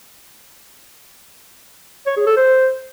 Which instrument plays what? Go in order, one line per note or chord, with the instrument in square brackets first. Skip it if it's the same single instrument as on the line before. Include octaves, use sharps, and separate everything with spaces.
[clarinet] C#5
G#4
A4
C5